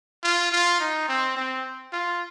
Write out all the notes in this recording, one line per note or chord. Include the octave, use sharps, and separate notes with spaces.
F4
F4
D#4
C4
C4
F4